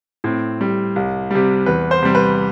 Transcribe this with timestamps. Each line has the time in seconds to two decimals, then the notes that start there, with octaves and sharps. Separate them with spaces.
0.24 A2 C4
0.61 G3
0.96 C2
1.31 C3 G3
1.66 E2 B4
1.91 C5
2.02 C3 G3
2.15 B4